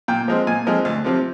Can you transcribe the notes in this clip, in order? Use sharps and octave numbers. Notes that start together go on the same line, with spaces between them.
A#2 G5
F3 G#3 C4
A#2 G#5
F3 G#3 C4
D2
C3 F3 C4